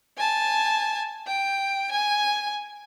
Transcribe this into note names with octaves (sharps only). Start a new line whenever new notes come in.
G#5 A5
G5
G#5